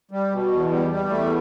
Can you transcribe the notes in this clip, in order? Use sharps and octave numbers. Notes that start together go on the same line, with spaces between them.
G3
B2
E2
G3
G3
E2 A3